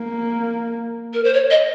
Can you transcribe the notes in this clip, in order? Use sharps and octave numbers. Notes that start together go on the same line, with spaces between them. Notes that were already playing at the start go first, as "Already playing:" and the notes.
Already playing: A#3
A#4
C5
C#5
D#5